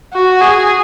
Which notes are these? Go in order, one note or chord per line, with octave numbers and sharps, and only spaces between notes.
F#4
G#4